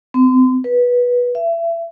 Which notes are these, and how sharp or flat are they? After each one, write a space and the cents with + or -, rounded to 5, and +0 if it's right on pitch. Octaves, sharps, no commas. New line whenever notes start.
C4 -35
B4 -15
E5 +30